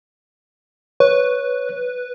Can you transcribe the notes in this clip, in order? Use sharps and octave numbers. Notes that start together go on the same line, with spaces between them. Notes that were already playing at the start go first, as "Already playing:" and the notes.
B4 C#5